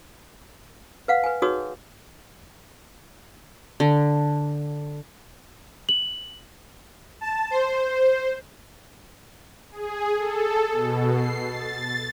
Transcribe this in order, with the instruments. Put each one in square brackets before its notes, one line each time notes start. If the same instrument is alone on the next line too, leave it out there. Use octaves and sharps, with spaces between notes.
[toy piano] B4 F5 F#5
B4 G#5
D#4 F#4 G#4 B4 C#5 D#6
[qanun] D3
[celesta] F#7
[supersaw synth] A5
C5
G#4
A4
B2
C7
A6